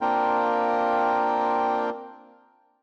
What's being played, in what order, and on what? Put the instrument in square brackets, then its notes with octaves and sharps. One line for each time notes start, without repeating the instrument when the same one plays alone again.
[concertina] A#3 C4 D4 F4 A#4 G5